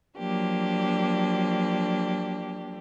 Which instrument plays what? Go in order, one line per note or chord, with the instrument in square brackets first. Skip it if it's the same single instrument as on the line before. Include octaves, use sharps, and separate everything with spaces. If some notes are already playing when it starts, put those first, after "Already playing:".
[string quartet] F3 F#3 A#3 D4 G4